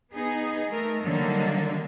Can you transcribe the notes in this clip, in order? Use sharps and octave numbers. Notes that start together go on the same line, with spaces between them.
B3 D#4 G#4
A3 A#4
D3 D#3 F#3 G3 A#3